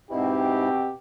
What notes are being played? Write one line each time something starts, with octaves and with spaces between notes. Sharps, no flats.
G#2 B2 C4 E4 G4